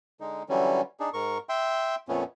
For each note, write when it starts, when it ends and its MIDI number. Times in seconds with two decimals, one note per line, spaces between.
0.20 0.43 50
0.20 0.43 56
0.20 0.43 63
0.49 0.81 50
0.49 0.81 52
0.49 0.81 54
0.49 0.81 55
0.49 0.81 61
1.00 1.09 62
1.00 1.09 63
1.00 1.09 68
1.14 1.38 44
1.14 1.38 70
1.14 1.38 85
1.49 1.95 76
1.49 1.95 79
1.49 1.95 84
2.09 2.24 41
2.09 2.24 46
2.09 2.24 57
2.09 2.24 59
2.09 2.24 61